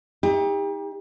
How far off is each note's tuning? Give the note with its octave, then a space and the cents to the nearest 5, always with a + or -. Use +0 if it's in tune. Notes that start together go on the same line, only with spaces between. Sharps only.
D#4 +35 G4 +35